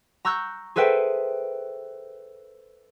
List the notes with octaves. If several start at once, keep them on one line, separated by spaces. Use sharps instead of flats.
A#5 C#6 E6 F#6 G6
G#4 A4 B4 C5 E5 G5